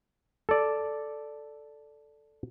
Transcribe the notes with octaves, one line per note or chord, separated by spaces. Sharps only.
A4 D5